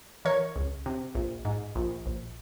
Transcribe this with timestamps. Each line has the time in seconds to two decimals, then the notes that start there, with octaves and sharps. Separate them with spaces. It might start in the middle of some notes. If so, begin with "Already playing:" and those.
0.25 E3 A#4 C#5
0.56 C#2
0.86 C3
1.15 A#1
1.45 G#2
1.76 A#1
2.06 A#1